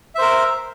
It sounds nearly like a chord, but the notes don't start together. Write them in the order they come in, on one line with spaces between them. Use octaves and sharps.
E5 C5 A#4